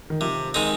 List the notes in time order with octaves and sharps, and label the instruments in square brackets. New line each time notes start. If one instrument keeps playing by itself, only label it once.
[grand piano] D#3
[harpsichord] C3 [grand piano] F3
[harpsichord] D#3 G#3 C4 D#4